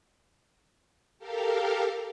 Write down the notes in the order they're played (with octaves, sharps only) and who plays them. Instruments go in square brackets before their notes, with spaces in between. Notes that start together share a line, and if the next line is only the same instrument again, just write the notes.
[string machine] G4 A4 A#4 F5